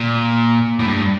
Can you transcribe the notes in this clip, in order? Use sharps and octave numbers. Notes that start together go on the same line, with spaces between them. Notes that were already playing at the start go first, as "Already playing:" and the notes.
Already playing: A#2
A2
G2